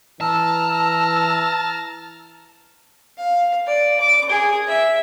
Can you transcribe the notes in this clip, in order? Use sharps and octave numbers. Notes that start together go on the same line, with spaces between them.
E3 A5 A#5 E6 F6
F5
D5
D6
G#4
E5